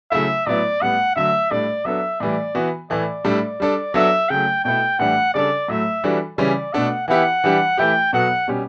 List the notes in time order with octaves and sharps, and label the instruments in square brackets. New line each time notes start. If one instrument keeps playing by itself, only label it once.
[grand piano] C#3 F#3 A3 E4 [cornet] E5
[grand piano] A2 F#3 B3 E4 [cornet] D5
[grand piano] A2 G3 B3 [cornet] F#5
[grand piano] D3 F#3 A3 [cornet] E5
[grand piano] A2 G3 D4 A4 [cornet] D5
[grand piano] F#3 B3 D4 A4 [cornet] E5
[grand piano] A2 E3 G3 [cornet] D5
[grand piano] E3 B3 F#4
[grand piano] A2 E3 A3 [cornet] D5
[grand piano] A2 G3 D4 A4
G3 D4 A4
[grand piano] F#3 B3 D4 F#4 A4 [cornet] E5
[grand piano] C#3 F#3 A3 [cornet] G5
[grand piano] B2 A3 E4 A4 [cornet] G5
[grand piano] A2 E3 G3 D4 G4 [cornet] F#5
[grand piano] C#3 G3 D4 A4 [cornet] D5
[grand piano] A2 F#3 A3 [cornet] E5
[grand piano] E3 G3 D4 F#4 A4
[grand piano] C#3 E3 G3 C#4 [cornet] D5
[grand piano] B2 A3 D4 A4 [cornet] F#5
[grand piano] E3 B3 E4 G4 [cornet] F#5
[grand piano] E3 G3 D4 G4
[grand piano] E3 A3 E4 G4 [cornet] G5
[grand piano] B2 F#3 B3 F#4 A4 [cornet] F#5
[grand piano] B2 G3 C#4 G4